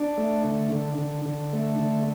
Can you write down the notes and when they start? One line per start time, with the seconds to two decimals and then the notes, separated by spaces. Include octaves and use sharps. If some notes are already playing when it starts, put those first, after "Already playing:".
Already playing: D4
0.18 A3
0.45 D3
0.72 D3
0.98 D3
1.25 D3
1.53 A3
1.79 D3